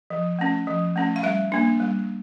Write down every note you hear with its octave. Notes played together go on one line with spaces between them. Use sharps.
F3
A3 C#4
F3
A3 C#4
F5
G3 E5
A#3 D4
G3